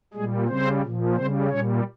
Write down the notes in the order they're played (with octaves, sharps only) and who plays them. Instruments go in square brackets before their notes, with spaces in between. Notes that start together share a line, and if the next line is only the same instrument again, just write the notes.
[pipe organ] A#2 G3 G#3 G#4
C#3 G3 C4 C5
A#2 F3
C#3 G3 C4 C5
A#2 G3 C#4 C#5